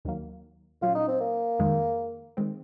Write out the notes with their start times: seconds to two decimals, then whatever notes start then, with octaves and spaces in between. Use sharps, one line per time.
0.05 D#2 D#3 F#3 A#3
0.81 A#2 F#3 C#4 F4
0.95 D#4
1.08 C4
1.21 A#3
1.59 F2 D#3 G#3
2.37 D#3 G#3 C4